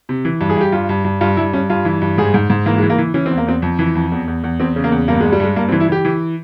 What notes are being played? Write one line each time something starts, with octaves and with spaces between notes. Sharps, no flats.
C3
E3
G2
G#4
G2 G4
G2 F4
G2
G2
G2 F4
G2 E4
G2 C#4
G2 F4
E3
G2
G#2 G#4
G#2
G#2
E3 A#3
G#3
E3
A#3
E3
E3 C#4
E2 C4
A#3
E2 C4
F2
E3
F2
E2
E2
E2
E2 C4
C#3
A#3
E2
G2 A#3
G2 G#3
G3
G2 G#3
G2 A#3
C4
E3
E4
E3 G4
E3